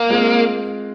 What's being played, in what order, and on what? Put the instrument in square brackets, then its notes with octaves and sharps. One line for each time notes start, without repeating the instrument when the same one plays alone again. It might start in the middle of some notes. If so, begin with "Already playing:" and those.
Already playing: [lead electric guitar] A#3
[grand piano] G#3 C4 F4 G#4 C5